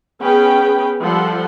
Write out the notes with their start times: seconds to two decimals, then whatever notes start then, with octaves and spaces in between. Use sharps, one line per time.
0.22 B3 C#4 G#4 B4 G5
1.02 F3 G3 A4 F#5 C6